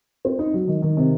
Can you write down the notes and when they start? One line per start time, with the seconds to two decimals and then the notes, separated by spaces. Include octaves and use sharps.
0.25 C4
0.39 D#4
0.54 F#3
0.68 D#3
0.82 D#3
0.97 C3